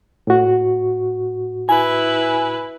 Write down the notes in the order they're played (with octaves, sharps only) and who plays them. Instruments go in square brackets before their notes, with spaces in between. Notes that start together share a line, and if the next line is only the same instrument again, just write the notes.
[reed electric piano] A2 F#4
[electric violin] E4 B4 [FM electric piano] G#5